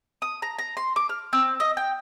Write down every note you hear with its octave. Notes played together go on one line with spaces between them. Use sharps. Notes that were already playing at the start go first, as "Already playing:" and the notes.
D#6
A#5
A#5
C6
D6
F6
C4
D#5
G5